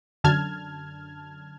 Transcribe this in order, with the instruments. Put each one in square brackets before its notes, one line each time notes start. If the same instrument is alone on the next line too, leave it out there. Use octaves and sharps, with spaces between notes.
[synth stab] F#2 D3 A5 F6 G#6